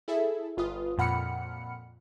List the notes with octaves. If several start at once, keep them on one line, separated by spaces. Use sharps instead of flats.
E4 G#4 A4 E5
G1 F4 B4 D#6
F2 A#2 F#5 B5 F6 C#7